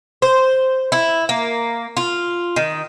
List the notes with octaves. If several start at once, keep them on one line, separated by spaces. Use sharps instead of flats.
C5
E4
A#3
F4
D#3